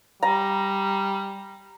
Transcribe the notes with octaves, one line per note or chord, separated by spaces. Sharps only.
G3 A#5